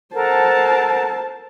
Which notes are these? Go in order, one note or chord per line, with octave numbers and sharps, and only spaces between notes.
A4 A#4 C5 F#5 A5